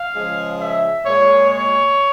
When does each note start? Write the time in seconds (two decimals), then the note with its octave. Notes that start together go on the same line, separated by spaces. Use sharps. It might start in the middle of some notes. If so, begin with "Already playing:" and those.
Already playing: F5
0.13 C#3 F3 G#3
0.58 E5
1.04 A#2 G#3 C#5
1.50 C#5